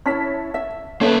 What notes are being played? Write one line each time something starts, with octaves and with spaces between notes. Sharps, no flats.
C#4 E4 C#5 E5 A5 B6
E5
A#3 C#4 A4 B4 C#5 E5